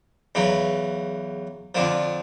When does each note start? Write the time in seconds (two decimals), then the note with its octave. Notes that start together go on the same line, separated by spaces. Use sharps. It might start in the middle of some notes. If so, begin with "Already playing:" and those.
0.35 E2 C#3 F#3
1.75 F2 D3 F3